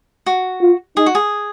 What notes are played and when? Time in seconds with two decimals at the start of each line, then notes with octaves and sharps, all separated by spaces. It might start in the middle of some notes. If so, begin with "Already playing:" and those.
0.26 F#4
0.61 F4
0.97 D#4 G#4
1.06 F#4
1.15 G#4